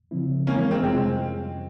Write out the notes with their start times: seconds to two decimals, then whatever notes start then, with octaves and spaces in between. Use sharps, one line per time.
0.11 C#3 F3 C4 E4
0.47 E3 G#3 A#3 C4 C#4 E4 A#4
0.59 A#3 C#4
0.71 G#3 C4
0.82 F2 C3 G3 G#3 C4 C#4 F4